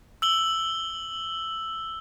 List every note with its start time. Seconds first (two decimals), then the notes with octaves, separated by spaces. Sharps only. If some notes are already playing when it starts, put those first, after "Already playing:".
0.22 E6 F#7 G7